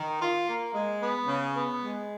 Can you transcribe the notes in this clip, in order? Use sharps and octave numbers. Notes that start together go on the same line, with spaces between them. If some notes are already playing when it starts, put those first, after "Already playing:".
Already playing: D#3
F4
A#3
G#3
B3
C#3
B3
G#3